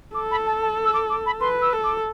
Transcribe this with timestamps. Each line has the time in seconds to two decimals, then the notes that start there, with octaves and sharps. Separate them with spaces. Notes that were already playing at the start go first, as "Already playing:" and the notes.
0.14 A4 D6
0.31 B5
0.46 A5
0.62 A5
0.85 E6
0.94 D6
1.10 D6
1.26 B5
1.41 B4 C6
1.62 E6
1.73 A4
1.84 D6